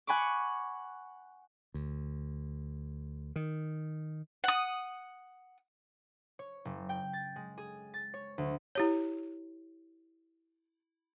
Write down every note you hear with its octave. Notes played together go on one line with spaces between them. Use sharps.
F#5 G#5 B5 C#6 D6
D2
D#3
F#5 D#6
C#5
F#1
G5
A6
G#3
G#4
A6
C#5
D2
E4 G4 C#5